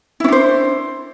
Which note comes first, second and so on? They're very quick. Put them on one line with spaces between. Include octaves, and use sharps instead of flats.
E4 C#4 D4 C5